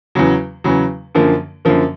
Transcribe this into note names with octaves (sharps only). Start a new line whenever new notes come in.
E2 C#3 F#3
E2 C#3 F#3
F#2 D3 F3 A#3
F#2 D3 F3 A#3